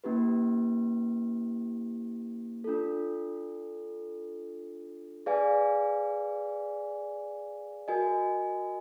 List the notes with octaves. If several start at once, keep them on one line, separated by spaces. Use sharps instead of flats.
A#3 C#4 E4 G4 B4
D4 F4 A4
G#4 B4 D5 F5 G#5
F#4 A#4 D#5 G#5